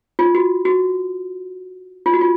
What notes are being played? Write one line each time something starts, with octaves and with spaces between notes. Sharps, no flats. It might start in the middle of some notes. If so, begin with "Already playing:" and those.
F4
F#4
F#4
F4
F#4
F4